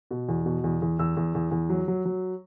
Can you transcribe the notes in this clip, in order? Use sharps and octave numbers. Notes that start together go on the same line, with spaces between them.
B2
E2
B2
E2
E2
E2 E6
E2
E2
E2
F#3
F#3
F#3